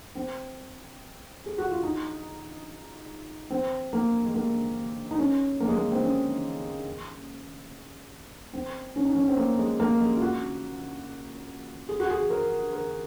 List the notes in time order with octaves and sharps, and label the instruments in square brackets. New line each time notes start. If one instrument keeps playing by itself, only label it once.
[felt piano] C4
G#4
F#4
F4
D#4
C4
A#3
G#3
A#3
D#4
C#4
A#3
G#3
A#3
C4
C#4
C4
C#4
D#4
C#4
C4
A#3
G#3
A#3
G#3
F4
F#4
G#4
F#4
G#4
A#4
A#4